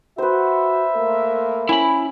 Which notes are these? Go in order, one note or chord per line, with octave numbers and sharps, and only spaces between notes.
F#4 B4 C5 E5
A3 A#3 A#4
C#4 E4 B5